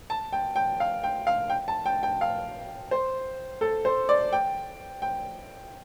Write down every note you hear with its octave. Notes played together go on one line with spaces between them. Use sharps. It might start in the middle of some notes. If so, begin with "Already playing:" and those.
A5
G5
G5
F5
G5
F5
G5
A5
G5
G5
F5
C5
A4
C5
D5
G5
G5